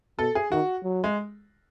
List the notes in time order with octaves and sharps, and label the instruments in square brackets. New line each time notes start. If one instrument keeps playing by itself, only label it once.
[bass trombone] B2 [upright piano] A4
[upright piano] G#4
[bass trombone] D#3 [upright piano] F#4
[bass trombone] F#3
[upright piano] G#3